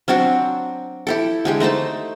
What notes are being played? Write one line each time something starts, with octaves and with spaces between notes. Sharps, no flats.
F#3 C4 D4 F#4
E4 G4 A4
D3 G#3 G4
A3 D#4 C5 A5